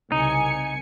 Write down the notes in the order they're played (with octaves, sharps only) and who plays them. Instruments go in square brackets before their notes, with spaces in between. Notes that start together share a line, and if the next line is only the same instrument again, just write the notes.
[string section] C2 G#5 C#7 [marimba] C#3 [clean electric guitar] D#4